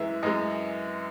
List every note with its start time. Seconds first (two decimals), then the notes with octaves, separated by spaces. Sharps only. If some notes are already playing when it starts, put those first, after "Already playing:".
Already playing: F#2 E3 G#3 E5
0.23 F#2 E3 G#3 D#5